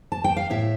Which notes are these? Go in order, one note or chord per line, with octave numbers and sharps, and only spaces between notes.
A5
G5
F5
A2 E5